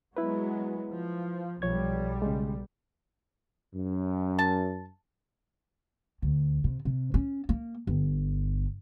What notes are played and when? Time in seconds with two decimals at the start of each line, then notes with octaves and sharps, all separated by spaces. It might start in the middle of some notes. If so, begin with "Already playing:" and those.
0.17 F#3 G#3 B3 E4 B4
0.93 F3
1.62 B1 F3 G3 C#5 G#6
2.22 C#3 G#3
3.75 F#2
4.39 A5
6.22 D2
6.64 C3
6.85 C3
7.14 C#4
7.49 A#3
7.87 G1